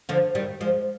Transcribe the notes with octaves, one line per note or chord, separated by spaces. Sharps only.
D3 F3
D#3 G3
F3 G#3